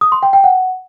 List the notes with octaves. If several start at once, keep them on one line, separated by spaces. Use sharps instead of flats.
D#6
C6
G5
G5
F#5